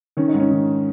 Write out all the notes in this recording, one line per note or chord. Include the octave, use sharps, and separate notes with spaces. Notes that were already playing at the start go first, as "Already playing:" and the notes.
D#3 C#4
D#4
G#2
C#4
D#3